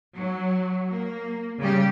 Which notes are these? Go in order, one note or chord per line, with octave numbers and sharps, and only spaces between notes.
F#3
A#3
C#3 G3 G4